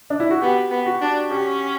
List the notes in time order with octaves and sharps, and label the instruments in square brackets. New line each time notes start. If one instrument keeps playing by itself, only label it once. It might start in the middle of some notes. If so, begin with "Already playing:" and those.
[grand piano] D4
E4
F#4
[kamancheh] B3 [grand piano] G4
[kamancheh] B3
[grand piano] F#4
[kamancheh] D4
[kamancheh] C#4 [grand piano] G4